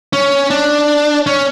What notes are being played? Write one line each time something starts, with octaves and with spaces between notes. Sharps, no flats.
C#4
D4
C#4